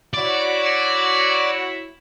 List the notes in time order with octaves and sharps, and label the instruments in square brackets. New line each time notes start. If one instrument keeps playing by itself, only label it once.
[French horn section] E4 F#4 C#5 [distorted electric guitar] D5